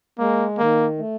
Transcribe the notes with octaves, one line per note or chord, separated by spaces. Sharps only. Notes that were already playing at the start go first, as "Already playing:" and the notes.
G#3 A#3
D#3 A#3
A3